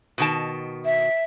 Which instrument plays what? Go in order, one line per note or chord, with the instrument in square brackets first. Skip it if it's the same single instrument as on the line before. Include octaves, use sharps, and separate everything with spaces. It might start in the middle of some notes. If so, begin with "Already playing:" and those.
[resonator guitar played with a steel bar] B2 D#3 A5
[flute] E5